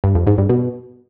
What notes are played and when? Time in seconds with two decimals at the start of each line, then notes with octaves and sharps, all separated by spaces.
0.04 G2
0.15 F2
0.27 G#2
0.38 G2
0.49 B2